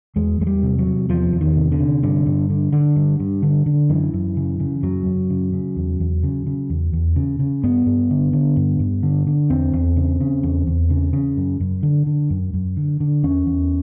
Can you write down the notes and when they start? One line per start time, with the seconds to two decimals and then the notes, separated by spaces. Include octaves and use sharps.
0.16 E2 G#3
0.40 E2 G#3
0.47 G3
0.63 C3
0.79 F#3
0.86 C3
1.09 E2 F3
1.33 E2
1.41 D#3
1.56 C3
1.72 D3
1.79 C3
2.03 G2 D3
2.26 G2
2.50 D3
2.72 D3
2.96 G2
3.20 G2
3.43 D3
3.66 D3
3.89 F#2 E3
4.13 F#2
4.37 C#3
4.60 C#3
4.83 F#2 F#3
5.06 F#2
5.30 C#3
5.53 C#3
5.76 E2
6.00 E2
6.23 C#3
6.46 C#3
6.70 E2
6.93 E2
7.16 C#3
7.39 C#3
7.63 G2 B3
7.86 G2
8.10 D3
8.33 D3
8.56 G2
8.80 G2
9.03 D3
9.27 D3
9.50 E2 C4
9.73 E2
9.97 C#3
10.20 C#3
10.43 E2
10.67 E2
10.90 C#3
11.13 C#3
11.37 F#2
11.60 F#2
11.83 D3
12.07 D3
12.30 F#2
12.54 F#2
12.77 D3
13.00 D3
13.23 E2 C#4
13.46 E2